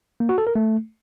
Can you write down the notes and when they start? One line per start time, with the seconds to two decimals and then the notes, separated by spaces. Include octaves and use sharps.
0.20 A#3
0.29 F#4
0.38 A4
0.47 A#4
0.55 A3